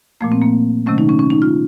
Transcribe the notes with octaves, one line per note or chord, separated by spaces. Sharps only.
A#2 F3 A3 A#3
C4
A#3
C3 D#3 F#3 A3 C#4
D#4
C#4
C#4
D#4
F4